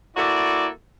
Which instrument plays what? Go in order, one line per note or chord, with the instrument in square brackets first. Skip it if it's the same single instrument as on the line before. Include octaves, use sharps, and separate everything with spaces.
[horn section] A#3 E4 F#4 A4 D5